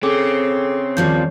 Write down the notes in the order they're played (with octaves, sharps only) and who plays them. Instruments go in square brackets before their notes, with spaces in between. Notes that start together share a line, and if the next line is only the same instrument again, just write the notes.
[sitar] C#3 [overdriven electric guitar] C4 [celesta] G#4 A4 D6
[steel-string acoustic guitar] D#2 F3 G3 [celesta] G6